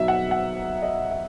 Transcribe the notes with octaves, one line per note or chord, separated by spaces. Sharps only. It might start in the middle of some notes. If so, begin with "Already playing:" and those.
Already playing: B2 F#3 B3 D#4 E5
F#5
F#5
D#5
E5